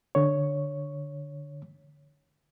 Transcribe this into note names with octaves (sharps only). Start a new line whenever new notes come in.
D3 C#5